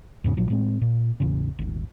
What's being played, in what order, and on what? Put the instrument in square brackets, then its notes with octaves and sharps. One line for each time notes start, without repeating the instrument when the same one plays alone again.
[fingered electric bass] E2 G#2 C#3
A#1 A#2 F3 F#3
A2 G#3 C4
A#2
E1 A1 C#3
D#1 G#1